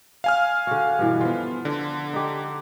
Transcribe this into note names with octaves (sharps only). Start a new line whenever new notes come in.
F5 G#5 F6
D3 F#4
G2 B2 E3
F3 B3 F4
D3
D#4 G4